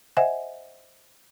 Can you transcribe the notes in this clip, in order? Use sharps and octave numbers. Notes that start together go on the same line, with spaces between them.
C5 D#5 E5 F#5 G#5